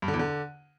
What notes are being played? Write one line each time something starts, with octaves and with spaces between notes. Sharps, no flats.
G2
D3
E2
D3